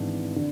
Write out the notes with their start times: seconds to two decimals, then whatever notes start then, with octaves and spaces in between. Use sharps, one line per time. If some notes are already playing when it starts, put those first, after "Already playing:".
Already playing: G#1 G#2 E3 B3 D4
0.36 D3